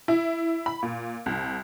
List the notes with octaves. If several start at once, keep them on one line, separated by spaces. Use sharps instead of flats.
E4
B5
A#2
C2